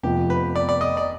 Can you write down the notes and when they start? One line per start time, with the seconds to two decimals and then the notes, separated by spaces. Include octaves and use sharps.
0.03 F1 F2 C3 F3 B3 G4
0.30 B4
0.56 D5
0.69 D5
0.81 D#5
0.97 D5